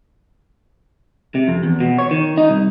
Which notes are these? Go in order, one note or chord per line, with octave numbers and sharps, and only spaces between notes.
C3
F2
E2
B2
C#5
D#3
D#4
C2